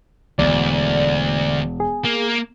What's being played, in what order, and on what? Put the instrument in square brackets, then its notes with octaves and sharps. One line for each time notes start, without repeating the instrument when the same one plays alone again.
[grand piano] E1 [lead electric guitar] D2 [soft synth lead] D5
[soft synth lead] G#4
[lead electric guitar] A#3